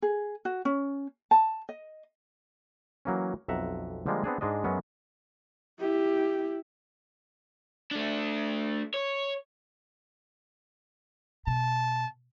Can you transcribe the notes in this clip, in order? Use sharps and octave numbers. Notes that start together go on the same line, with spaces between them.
G#4
F#4
C#4
A5
D#5
E3 F#3 A#3 C#4
B1 F2 E5 F#5 A#5
D3 F3 G3 G#3 A#3
B3 C4 D4 G#4
G#2 G#3 D4 D#5
F#2 F#3 G#3 B3 C#4
E4 G4
A3 D4
C#5
B2 A5